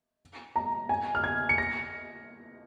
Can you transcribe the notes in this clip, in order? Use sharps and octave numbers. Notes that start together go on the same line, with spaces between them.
A#5
G#5
F6
G#6
C#7
A#6